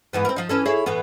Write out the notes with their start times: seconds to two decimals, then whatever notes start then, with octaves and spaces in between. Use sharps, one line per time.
0.13 G#2 E3 B3
0.25 C4 A#4
0.36 F3 D#4
0.49 E3 C#4 A4
0.66 E4 G#4 C#5
0.86 A2 E3 B3